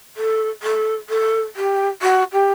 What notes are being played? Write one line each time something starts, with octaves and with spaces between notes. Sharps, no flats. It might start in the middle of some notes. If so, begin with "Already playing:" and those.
A4
A4
A4
G4
F#4
G4